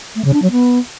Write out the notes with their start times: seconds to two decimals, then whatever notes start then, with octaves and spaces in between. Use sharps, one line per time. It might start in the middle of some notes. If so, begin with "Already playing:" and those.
0.16 A3
0.25 C#3
0.33 D4
0.42 F#3
0.51 B3